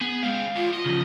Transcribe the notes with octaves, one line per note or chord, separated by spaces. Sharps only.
B3 G#4
C#3 G#3 C4 F5
E2 F4
F4 D#5
C#3 F3